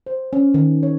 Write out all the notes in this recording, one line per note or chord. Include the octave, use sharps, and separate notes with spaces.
C5
C#4
D#3
C#5